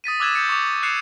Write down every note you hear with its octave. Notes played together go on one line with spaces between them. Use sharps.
D#6 A6 B6 D#7
D6 E6 F#6 G#6 A6 E7
G6 A6 C#7
C#6 D6
A6
F#6 C7 C#7 E7 F7